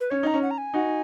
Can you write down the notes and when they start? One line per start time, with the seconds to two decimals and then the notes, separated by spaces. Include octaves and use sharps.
0.01 B4
0.10 C#4 C#5
0.23 D#4 A#5
0.34 C#4
0.42 F#5
0.51 A#5
0.58 G#5
0.74 D#4 F#4